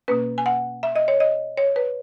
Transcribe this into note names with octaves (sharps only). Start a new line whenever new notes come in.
B2 A#3 C#4 B4
G#5
F#5
E5
D#5
C#5
D#5
C#5
B4